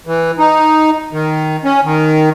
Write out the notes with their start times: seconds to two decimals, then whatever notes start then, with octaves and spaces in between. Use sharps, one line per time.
0.06 E3
0.39 D#4
1.13 D#3
1.64 C#4
1.84 D#3